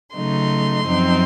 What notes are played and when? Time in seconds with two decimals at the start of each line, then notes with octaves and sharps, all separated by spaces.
0.16 C#3 F#3 A3 D#4 C6
0.87 F#2 F3 C4 D#4